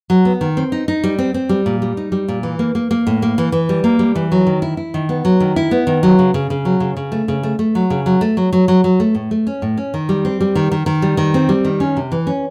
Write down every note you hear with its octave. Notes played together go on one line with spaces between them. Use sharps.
F#3
B3
D#3
C4
D#4
D#4
G3
C4
C4
G3
A#2
G3
D#4
G3
A#2
E3
A#3
A#3
A#3
A2
A#3
E3
E3
G3
A#3
G3
E3
F#3
D#3
E4
E4
D#3
B3
F#3
D#3
E4
B3
D#3
F#3
C#3
C#3
C#3
F#3
C#3
C#3
A3
C#3
A3
A3
F#3
C#3
F#3
A3
F#3
F#3
F#3
F#3
A3
A2
A3
C#4
A2
C#4
D#3
G3
C4
G3
D#3
D#3
D#3
G3
D#3
C4
G3
D#3
C#4
C3
E3
C#4